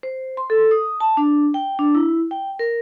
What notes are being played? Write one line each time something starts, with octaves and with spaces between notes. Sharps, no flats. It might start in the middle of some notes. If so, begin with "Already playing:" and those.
C5
C6
A4
D#6
A5
D4
G5
D4
E4
G5
A#4